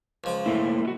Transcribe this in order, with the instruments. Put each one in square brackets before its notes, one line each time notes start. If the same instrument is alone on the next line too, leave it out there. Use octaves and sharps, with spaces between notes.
[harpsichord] C#2 F3 D6
[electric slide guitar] A3 A#3 E4
A3 F#4